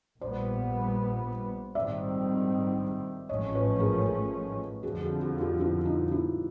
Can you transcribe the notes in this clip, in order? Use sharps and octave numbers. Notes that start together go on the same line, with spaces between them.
A#1 A#2 G3 B3 C5 D5
A#1 G#2 D#3 G3 C4 D5 E5
A1 G#2 F3 A3 C#4 C#5 D#5
B4 C#5
G#4 A#4
G#4 A#4
F2 D3 F3 F#4 G#4
F#4 G#4
F#4 G#4
F4 G4
E4 F#4
D#4 F4
E4